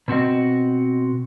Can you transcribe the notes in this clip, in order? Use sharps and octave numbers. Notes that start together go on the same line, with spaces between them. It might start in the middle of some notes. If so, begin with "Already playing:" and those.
B2 C4 F#4 D#5